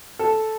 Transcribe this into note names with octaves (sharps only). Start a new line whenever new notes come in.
A4